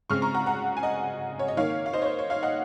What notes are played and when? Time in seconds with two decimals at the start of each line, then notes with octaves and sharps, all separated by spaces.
0.10 C#3 G#3 C4 C#6 F6
0.22 A#5 C#6
0.34 F#5 A#5
0.46 F#5 A#5
0.77 G#5
0.83 D#5 F#5
1.39 C#5
1.48 D#5
1.57 D#3 A#3 C#5 F5
1.86 F5
1.93 C5 D#5
2.02 C#5
2.06 C5
2.19 C#5
2.30 C#5 F5
2.43 D#5 F#5